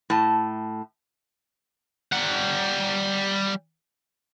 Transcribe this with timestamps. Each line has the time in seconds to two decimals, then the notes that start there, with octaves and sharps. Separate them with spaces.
0.10 A2 A5
2.13 G3 F#5